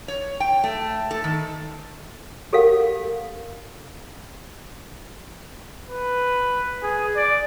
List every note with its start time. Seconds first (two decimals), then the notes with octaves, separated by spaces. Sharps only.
0.08 C#5
0.40 G5
0.64 A3
1.11 A4
1.24 D#3
2.53 G4 A4 A#4 F5 F#5
5.90 B4
6.82 G#4
7.16 D5